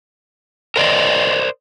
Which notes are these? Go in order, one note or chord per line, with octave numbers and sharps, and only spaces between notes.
A#4 C5 D5 D#5